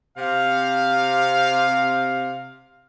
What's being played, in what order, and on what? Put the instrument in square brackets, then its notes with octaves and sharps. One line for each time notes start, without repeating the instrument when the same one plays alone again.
[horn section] C3 F5